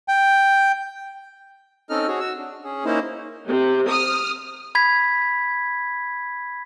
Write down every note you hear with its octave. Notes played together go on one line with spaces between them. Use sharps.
G5
C4 C#4 D#4 A4 D#5 F6
F#4 G#4 C#5
F#4 E6
D4
C#4 G#4
A#3 C#4 D#4 E4 C5
C3
D#6 F6
B5 G#6 B6